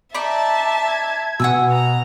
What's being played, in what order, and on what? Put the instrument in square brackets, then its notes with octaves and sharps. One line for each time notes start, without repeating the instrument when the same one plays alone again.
[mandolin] D#4 D5 B5 [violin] E5 A5
[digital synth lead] G#6
[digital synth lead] B2 [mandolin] F#5 G#5 E6
[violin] A#5